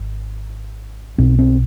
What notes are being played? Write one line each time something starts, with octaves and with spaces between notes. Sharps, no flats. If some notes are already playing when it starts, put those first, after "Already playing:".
Already playing: G#1
B1 B2 C4
C4